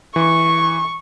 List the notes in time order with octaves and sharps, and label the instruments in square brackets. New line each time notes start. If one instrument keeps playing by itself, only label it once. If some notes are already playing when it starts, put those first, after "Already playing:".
[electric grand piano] E3 [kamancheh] C#6